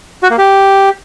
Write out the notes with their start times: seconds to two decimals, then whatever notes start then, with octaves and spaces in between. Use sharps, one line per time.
0.23 F#4
0.31 A#3
0.38 G4